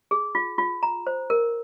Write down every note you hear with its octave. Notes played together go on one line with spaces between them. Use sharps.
G#4
F4
F4
A#5
C5
A#4